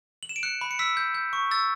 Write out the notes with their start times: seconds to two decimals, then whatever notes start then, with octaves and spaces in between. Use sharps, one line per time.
0.23 F#7
0.29 E7
0.36 D7
0.43 F#6 C#7
0.61 B5
0.71 C#7
0.79 E6 B6
0.97 G6
1.15 G6
1.33 C#6
1.51 E6 A6